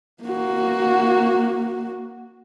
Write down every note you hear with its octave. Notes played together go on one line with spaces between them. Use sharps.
A#3 F#4